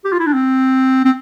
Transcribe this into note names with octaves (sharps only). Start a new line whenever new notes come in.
G4
F4
E4
D4
C4
C4